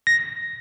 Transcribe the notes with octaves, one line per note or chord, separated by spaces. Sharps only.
A#6